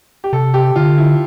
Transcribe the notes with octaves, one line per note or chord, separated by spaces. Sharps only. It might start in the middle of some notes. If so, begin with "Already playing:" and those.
G4
C3 A4
G4
D3 F4
E4